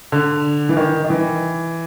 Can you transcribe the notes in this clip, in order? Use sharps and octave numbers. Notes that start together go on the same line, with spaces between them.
D3
E3
D#3
D#3
E3